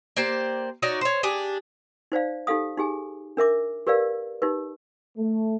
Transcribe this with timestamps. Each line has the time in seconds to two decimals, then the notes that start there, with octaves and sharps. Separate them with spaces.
0.17 A#3 G4 C5 D5
0.82 D#4 F#4 C#5 D5
1.01 C5 C#5
1.23 D4 G4 G#4
2.12 D#4 C5 D5 F5
2.47 D#4 G4 A4 F5 D#6
2.78 D#4 G4 G#4 G#5
3.37 D4 A#4 E5 D6
3.87 G4 A#4 B4 D5 F5
4.42 D#4 G4 B4
5.17 A3